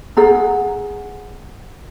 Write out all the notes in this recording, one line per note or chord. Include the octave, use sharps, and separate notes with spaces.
G#4 F#5 A#5